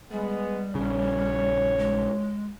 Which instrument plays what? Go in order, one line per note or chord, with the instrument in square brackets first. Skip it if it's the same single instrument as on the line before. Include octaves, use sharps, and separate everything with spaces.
[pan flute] G3 [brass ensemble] G#3 B3
[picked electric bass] A#1 C#3 [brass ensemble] C#5
[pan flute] G#3